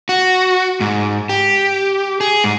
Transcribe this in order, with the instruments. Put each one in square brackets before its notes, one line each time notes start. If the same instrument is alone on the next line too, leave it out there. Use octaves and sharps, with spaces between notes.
[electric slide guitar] F#4
G#2
G4
G#4
G#2